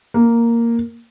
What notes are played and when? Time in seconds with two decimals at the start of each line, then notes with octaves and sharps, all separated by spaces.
0.14 A#3